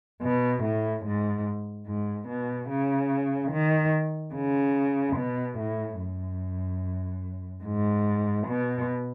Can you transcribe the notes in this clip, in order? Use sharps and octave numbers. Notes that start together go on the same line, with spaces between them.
B2
A2
G#2
G#2
B2
C#3
D#3
C#3
B2
A2
F#2
G#2
B2